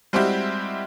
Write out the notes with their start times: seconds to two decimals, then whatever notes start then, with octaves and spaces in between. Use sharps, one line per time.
0.13 G3 G#3 C4 E4 F#4 G4